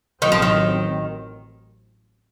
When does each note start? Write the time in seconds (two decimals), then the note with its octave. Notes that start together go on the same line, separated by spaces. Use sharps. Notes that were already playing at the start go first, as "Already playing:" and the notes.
0.22 A1 A2 D#3 F#3 C4
0.32 F3
0.42 D#3